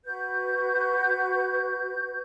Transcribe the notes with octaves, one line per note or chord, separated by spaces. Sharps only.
F#4 B4 G6